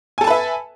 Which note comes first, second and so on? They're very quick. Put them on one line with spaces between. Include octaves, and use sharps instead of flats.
G#5 A4 A5 B4 E5